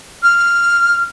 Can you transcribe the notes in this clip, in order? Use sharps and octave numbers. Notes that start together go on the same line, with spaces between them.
F6